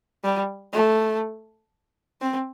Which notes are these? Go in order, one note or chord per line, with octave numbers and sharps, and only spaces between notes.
G3
A3
C4